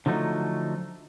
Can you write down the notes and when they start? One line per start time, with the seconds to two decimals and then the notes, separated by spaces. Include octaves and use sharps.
0.06 D3 F3 F#3 A3 D#4